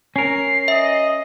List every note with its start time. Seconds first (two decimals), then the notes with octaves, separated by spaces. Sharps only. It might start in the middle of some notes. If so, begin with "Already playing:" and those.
0.16 C#4 A#4 C7
0.68 D#5 E5